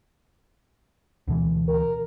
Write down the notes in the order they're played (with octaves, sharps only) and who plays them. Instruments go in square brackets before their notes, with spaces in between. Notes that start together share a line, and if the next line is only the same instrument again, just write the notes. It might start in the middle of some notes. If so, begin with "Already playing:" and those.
[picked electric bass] D2 B2 E3
[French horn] A#4